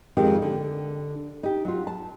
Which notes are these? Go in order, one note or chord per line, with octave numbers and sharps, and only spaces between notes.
F2 D#3 G#3 G4
D3
D#4 G4
F#3 F4
A5